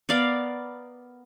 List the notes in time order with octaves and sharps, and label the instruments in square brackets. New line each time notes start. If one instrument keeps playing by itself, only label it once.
[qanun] B3 A#4 D5 F5